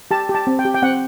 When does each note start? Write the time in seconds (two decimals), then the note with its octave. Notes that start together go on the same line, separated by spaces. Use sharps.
0.11 G4 A5
0.29 G4
0.35 A5
0.47 C4
0.59 G5
0.65 G4
0.75 G5
0.82 C4 F#5